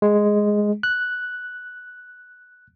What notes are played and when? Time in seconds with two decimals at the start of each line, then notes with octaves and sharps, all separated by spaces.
0.02 G#3
0.83 F#6